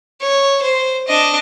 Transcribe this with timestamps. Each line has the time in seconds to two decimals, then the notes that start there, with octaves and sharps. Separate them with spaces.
0.21 C#5
0.62 C5
1.08 D4 D#5